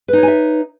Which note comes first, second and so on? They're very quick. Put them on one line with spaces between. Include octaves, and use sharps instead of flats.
B4 D#4 C#5 G#5 E5